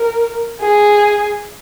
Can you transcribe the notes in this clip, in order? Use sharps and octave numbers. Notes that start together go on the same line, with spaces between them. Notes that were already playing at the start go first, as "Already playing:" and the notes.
Already playing: A#4
G#4